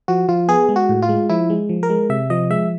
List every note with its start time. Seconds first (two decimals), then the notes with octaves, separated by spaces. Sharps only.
0.08 F3 F#4
0.28 F3 F4
0.48 B3 G#4
0.69 G#3
0.76 F#4
0.89 A2
1.02 F4
1.09 G#3
1.29 F3 E4
1.50 G#3
1.69 F3
1.83 A#4
1.90 G#3
2.10 C3 E5
2.30 F3 D#5
2.50 G#3 E5